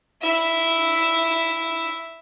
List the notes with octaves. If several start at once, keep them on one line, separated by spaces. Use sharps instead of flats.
E4 E5